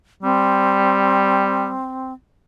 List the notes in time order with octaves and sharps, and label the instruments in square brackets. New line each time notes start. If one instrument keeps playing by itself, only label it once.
[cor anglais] G3 [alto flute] C4